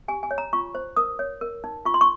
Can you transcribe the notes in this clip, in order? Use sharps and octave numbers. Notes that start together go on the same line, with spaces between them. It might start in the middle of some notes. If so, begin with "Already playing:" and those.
G4 G#5
G#5
C#5
A#5
F4 C#6
C5
A#4 D#6
C#5
A#4
D#4
F4 C#6
C6
C#6